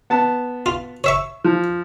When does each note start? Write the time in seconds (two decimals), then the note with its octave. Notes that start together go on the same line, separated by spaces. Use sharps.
0.10 B3 A5
0.66 F4
1.04 C#5 E5 C#6
1.44 F3